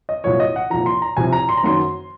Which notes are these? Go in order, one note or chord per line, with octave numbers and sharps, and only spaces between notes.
D#5
C2 A#2 F#3 C#5
D#5
F#5
C2 A#2 F3 A#5
C6
A#5
C2 C3 F3 G#5
A#5
C6
A#5
F#1 F#2 D#3 F#3 C6